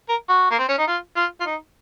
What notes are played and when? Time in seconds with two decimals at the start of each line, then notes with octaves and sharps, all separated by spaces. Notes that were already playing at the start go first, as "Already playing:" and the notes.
0.09 A#4
0.29 F#4
0.51 A#3
0.59 C4
0.69 C#4
0.78 D#4
0.88 F4
1.16 F4
1.40 F4
1.46 D#4